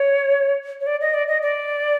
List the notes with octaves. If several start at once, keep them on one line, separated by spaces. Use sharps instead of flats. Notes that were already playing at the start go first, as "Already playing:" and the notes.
Already playing: C#5
C#5
D5
D#5
D5
D#5
D5